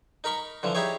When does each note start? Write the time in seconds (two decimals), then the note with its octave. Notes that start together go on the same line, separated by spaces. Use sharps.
0.24 D#4 A#4 B5 C#6
0.63 D3 E3 F3
0.75 D#4 E4 G4 G#4 C#5